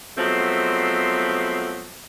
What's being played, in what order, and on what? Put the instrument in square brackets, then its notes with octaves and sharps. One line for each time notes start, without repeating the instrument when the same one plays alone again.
[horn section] F3 F#3 G#3 A3 B3 C4